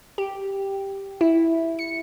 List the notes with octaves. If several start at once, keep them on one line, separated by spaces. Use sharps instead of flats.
G4
E4
C#7